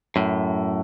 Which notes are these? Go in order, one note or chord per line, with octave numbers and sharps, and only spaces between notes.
F#2 A2